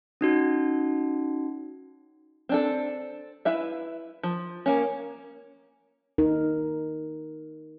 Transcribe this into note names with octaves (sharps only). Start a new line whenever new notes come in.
C#4 D#4 F#4
C4 D4 A4
E4 B4 E5 F5
F3
A#3 C#4
D#4 A#4